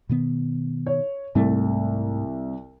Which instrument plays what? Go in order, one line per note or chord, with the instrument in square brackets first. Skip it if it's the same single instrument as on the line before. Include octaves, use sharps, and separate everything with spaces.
[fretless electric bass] B2 D#3 B3
[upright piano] C#5
[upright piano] C2 [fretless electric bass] G#2 A3